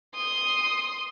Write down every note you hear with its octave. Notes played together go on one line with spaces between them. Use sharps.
C6 D#6